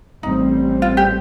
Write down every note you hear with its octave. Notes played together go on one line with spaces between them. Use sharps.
A1 A2 G3 C4 D#4
F4
G4